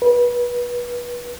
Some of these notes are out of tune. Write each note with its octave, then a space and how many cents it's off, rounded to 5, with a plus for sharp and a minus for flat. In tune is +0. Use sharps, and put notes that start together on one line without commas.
B4 -25